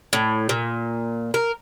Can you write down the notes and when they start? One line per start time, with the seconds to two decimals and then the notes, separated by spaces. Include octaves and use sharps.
0.13 A2
0.49 A#2
1.34 A#4